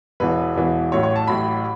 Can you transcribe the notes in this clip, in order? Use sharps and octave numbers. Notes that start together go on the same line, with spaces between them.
E1 E2 E3 B4
E1 E2 E3
A1 A2 F#3 C#5
C#5
A5
A1 A2 F#3 B5